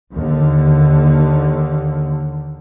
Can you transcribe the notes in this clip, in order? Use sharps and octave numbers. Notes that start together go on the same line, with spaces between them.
D#2 D3